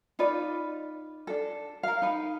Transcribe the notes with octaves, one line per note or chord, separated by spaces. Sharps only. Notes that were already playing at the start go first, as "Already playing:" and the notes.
D#4 F4 B4 D5
D4 A4
A#4 F5
D#4 B4